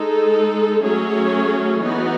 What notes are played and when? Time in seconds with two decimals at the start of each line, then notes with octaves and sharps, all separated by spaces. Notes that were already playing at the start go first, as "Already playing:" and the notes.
Already playing: G#3 D#4 A4
0.81 F#3 A3 C#4 G#4 C#5
1.81 E3 B3 D#4 F#4